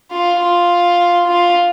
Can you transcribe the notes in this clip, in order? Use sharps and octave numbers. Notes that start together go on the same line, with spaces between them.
F4
F4
F4